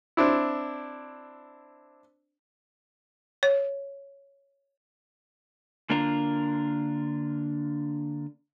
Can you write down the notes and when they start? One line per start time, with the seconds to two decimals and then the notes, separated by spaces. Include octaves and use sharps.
0.17 C4 D4 E4
3.43 C#5
5.90 D3 A#3 D4 F4 A#4